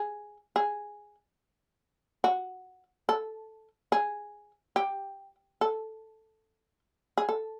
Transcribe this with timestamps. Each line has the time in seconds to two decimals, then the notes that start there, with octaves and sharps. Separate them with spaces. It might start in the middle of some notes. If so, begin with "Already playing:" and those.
Already playing: G#4
0.56 G#4
2.24 F#4
3.09 A4
3.92 G#4
4.76 G4
5.61 A4
7.18 G#4
7.29 A4